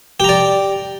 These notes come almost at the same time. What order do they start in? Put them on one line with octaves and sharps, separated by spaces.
G4 A#5 D5